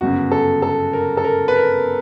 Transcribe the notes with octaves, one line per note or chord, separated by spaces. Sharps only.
G1 F#2 C#3 F#4
A4
A4
A#4
A4
A#4
B4
A#4